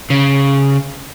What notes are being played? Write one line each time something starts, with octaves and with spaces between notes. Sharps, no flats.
C#3